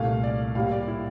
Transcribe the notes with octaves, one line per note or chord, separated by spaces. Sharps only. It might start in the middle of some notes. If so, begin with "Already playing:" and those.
Already playing: C2 A#2 A3 F5
D5
A2 G3 A#3 F5
D5
E4